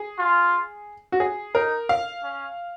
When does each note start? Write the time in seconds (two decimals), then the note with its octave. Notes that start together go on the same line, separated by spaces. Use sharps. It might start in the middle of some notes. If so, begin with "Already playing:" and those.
Already playing: G#4
0.18 F4
1.12 F#4
1.20 G#4
1.55 D#4 A#4
1.89 F5
2.23 C#4